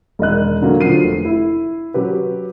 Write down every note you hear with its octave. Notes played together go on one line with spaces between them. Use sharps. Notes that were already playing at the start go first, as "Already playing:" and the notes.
E1 D#3 D#5 F#6
D3 F#3 A3 A#3
D3 F3 F#3 C7 D#7
F1
E4
F#3 C#4 G4 B4